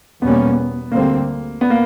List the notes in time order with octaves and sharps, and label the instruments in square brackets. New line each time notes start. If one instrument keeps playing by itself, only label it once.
[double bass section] E2 B2 G3 A#3 C#4 [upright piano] B3
[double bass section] D2 D3 G3 C4 [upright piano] A#3
[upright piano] B3
A#3